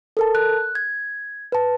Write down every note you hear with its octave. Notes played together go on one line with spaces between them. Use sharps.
A4 A#4 A5
F#6
G#6
B4 A5